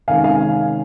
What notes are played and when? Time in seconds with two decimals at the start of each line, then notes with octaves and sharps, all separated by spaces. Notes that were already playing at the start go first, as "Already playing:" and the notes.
0.08 C3 D#3 G#3 C#4 F5 G#5
0.24 F5 G#5